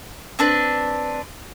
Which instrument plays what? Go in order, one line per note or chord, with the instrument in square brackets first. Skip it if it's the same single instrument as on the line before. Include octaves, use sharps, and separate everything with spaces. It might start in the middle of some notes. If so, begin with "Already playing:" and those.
[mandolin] C4 D4 B4